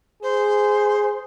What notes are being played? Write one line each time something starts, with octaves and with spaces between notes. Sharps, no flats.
G#4 C5